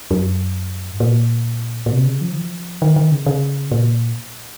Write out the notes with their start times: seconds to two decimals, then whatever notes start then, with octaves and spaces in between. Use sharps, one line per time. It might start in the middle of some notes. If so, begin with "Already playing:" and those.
0.11 F#2
0.91 G#2
1.00 A#2
1.86 A#2
1.92 C3
2.06 C#3
2.21 F3
2.32 D#3
2.37 F3
2.82 D#3
2.96 D#3
3.12 C#3
3.26 C#3
3.71 A#2